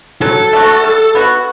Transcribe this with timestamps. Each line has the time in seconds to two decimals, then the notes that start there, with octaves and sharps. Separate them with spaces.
0.21 F#3 A4
0.53 A3 D4 F#4
0.84 G3
1.15 B3 F#4